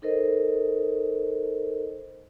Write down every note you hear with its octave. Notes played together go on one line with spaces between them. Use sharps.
D#4 A4 A#4 C5 D#5